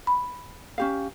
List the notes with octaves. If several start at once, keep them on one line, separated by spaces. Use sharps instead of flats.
B5
C#4 G4 F5